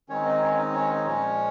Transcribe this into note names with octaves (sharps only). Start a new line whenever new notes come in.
D#3 G#3 C4 C#4 D#4 C#5
D#4 D#5
C#4 C#5
D#4 D#5
C#4 C#5
D#4 D#5
A#2 F3 G#3 C#4 C#5